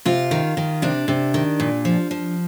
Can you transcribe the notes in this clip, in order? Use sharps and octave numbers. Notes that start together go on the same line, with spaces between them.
C3 F4
D#3
D#3
C3 D4
C3
D#3
A#2
F3
F3